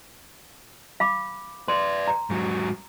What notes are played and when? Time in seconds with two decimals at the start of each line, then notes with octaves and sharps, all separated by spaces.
1.00 F5 B5 D6
1.68 B4 D5 C6
2.07 A#5
2.30 G#2 F#3